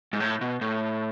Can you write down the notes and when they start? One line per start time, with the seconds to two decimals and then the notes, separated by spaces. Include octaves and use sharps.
0.13 G#2
0.20 A2
0.41 B2
0.61 A2